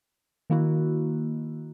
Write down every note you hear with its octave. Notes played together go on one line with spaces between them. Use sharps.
D#3 A#3 E4 F#4